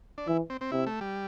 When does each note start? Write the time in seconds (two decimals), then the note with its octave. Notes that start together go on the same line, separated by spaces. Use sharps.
0.18 D4
0.27 E3 E4
0.50 C4
0.61 C4
0.71 C3 E4
0.87 A3
1.01 G3